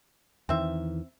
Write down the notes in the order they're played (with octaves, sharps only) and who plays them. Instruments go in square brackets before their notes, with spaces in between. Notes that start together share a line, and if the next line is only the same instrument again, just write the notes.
[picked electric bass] E2 D#3 E3 [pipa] C4 E5